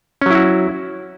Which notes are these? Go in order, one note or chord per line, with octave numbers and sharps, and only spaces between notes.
F#3 C#4 E4 F#4